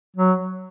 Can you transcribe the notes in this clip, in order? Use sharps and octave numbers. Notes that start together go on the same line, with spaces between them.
F#3